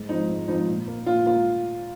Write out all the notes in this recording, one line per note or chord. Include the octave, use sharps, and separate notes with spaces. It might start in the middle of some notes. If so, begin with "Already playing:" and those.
Already playing: G#2
F3 C4 D#4
G#2
F3 C4 D#4
A#2
A#3
A#2 F4
A#3 F4